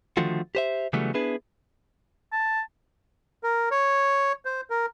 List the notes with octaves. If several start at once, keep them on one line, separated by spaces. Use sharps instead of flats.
D3 D#3 F3 A3 F4 F#4
G4 C5 E5
C#3 E3 F#3 G3 A3 B3
B3 D4 E4 G#4 B4
A5
A#4
C#5
C5
A#4